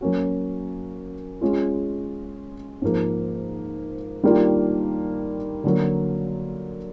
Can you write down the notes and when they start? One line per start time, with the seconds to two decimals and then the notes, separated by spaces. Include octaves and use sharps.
0.01 F#3 A#3 C#4 F#4
1.41 G#3 C#4 F4
2.82 G#2 F3 A#3
4.23 D#3 G3 A#3 D4 F4
5.64 D3 F#3 A#3